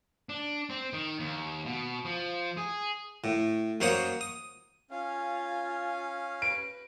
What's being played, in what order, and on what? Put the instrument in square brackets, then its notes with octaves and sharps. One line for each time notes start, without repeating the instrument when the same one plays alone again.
[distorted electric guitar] D4
C4
D#3
D#2
B2
F3
G#4
[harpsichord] A2
F#2 A#3 C5 C#5 F#5 D#6
D#6
[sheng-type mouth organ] C#4 F5 [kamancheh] F4 G#5
[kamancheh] B4 [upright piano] D7